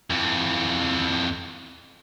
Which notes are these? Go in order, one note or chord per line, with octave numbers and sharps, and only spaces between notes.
F2 E3